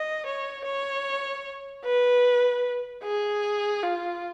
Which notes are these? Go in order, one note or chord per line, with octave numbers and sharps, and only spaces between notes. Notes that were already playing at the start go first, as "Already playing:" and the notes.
Already playing: D#5
C#5
C#5
B4
G#4
F4